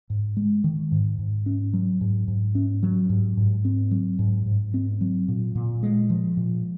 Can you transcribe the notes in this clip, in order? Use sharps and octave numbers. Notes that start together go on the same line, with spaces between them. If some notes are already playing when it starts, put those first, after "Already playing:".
G#2
G#3
D#3
G#2
G#2
C#4
F#3
G#2
G#2
C#4
F#3
G#2
G#2
C4
F#3
G#2
G#2
C4
F#3
A#2
A#2
G#3
F3
A#2